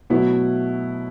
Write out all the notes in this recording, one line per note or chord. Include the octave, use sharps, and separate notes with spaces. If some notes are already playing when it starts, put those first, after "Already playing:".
B2 F#3 A3 B3 E4